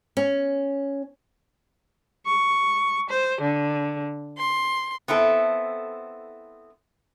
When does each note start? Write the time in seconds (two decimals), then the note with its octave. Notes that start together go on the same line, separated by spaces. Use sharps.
0.17 C#4
2.25 C#6
3.09 C5
3.41 D3
4.37 C6
5.08 B3 C4 E4 A4